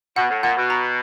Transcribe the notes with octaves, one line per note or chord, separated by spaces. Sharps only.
B2 F#5
A2
A#2 F#5
B2
A#5